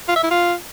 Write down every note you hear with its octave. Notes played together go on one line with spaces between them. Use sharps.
F4
E5
E4
F4